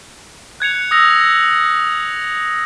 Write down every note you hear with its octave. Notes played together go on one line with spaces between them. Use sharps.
F#6 G#6 C#7 F7
D#6 E6 A#6 F7